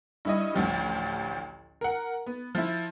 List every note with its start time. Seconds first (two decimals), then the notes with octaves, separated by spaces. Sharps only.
0.25 G2 E4 D#5
0.54 A1 D2 F3 G4
1.81 A#4 F#5
2.26 B3
2.55 F3 E4